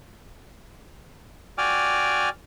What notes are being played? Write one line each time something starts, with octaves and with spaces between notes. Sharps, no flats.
F#4 D5 G5 G#5 D6 F6